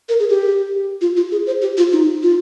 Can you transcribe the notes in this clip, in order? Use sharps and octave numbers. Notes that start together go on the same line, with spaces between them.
A#4
G#4
G4
F4
F4
G#4
C5
G4
F4
D#4
F4